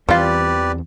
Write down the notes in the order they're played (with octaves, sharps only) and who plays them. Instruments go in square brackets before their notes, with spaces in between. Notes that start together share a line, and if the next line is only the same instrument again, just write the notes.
[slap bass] E2 E3 C4 [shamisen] G3 F4 [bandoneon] G4 B4 D5